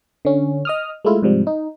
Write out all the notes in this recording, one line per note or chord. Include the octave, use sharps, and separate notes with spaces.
D3 C#4
D#5 D#6 F6
G#3 A3 E4 F4
G#2 C3 F3 G3
D#4